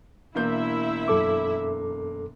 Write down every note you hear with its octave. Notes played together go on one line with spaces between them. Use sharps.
E1 A#3 E4 E5 G6
F#2 A4 D6